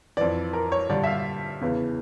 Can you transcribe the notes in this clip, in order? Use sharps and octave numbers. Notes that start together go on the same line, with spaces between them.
F2 E3 D5
A#4
C#5
G2 D3 D5
E5
F5
E2 C#3 E3